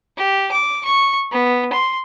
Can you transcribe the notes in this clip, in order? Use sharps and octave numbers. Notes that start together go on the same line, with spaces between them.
G4
D6
C#6
B3
C6